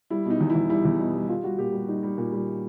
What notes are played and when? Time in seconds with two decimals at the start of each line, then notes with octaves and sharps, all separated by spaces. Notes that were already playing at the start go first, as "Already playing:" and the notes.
0.10 G3 E4
0.26 B2 D#4
0.40 E2
0.50 E4
0.55 E2
0.69 G3 E4
0.85 E2
1.00 B2
1.14 G3
1.29 G3 F4
1.44 G3 F#4
1.58 A#2 G4
1.73 G3
1.88 G3 D#4
2.03 G3
2.18 A#2
2.32 G3